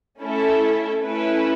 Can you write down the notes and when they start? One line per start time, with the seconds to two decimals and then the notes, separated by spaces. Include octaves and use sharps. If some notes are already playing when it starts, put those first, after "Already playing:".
0.20 A3 C#4 E4 A4 E5
1.03 A3 C#4 E4 B4